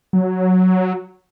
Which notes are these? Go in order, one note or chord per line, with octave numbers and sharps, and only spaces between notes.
F#3